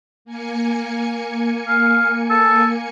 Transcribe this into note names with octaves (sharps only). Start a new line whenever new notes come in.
A#3 G#5 C#7
F5
A4